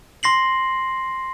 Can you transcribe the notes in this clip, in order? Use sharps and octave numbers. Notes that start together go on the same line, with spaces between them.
C6 A#6 C7 F#7